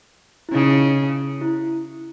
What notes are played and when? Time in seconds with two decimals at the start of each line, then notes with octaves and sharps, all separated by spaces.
0.49 E4
0.52 C#3 D#4
1.41 E4